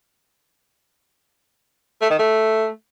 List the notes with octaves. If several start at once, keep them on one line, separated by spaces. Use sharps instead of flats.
A3
D#3
A3